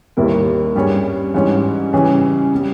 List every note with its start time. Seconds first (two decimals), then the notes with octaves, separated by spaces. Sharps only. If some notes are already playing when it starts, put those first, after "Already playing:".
0.17 D#2 D#3 G3 A#3 E4
0.76 G2 G3 C#4 G#4 C#5
1.34 G#2 E3 G3 C#4
1.93 C#3 E3 G3 C#4 G#4
2.55 G3